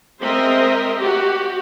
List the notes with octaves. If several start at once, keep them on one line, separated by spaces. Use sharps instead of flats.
G#3 C4 A#4 C5 D#5 E5
F#4 G4